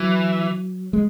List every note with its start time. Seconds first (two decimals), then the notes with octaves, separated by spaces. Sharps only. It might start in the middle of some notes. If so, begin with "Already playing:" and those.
Already playing: E3 F#3
0.93 G#3